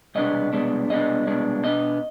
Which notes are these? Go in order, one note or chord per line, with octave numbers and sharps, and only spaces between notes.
C2 B2 G#3 B3 D4 D#5
C2 B2 G#3 B3 D4
C2 B2 G#3 B3 D4 D#5
C2 B2 G#3 B3 D4
B2 B3 D4 D#5